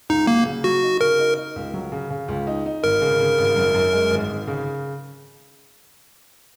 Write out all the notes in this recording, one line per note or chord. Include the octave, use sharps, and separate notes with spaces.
C#2 D#4
F#3 A#3
C#3
F#3 F#4
D#4
C#3 A#4
D#4
D#4
C#2
F#3
C#3
C#3
C#2
D#4
D#4
G#1 A#4
C#3
C#3
G#1
F#2
F#2
G#3
G#1
G#1
C#3